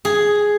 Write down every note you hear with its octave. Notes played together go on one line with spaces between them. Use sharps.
G#4